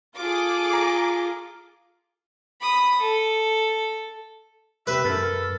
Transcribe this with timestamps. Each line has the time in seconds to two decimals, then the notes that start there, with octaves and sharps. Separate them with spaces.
0.16 F4 G#4 A4 D6
0.73 A#5
2.61 B5 D#6
3.00 A4
4.87 G4 B4 E5
5.05 F#2 A4 A#4